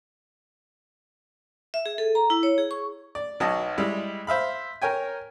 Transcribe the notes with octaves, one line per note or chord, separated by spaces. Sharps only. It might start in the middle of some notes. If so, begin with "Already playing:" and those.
E5
G#4
A4
A#5
E4
C#5
G#4
C#6
D5
B1 F#3 D#5 A5
G3 G#3 E4
C5 E5 F5 B5
A#4 C#5 G5 G#5